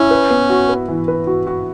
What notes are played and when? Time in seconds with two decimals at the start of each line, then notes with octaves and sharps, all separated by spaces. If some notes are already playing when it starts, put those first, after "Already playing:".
Already playing: C#4 E4
0.11 B4
0.30 B3
0.50 F#4
0.69 B4
0.88 E3
1.08 B4
1.27 F#4
1.47 F#4